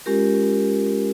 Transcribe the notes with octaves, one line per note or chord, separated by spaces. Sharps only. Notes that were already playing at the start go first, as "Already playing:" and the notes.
G#3 C#4 F4 G4 A#4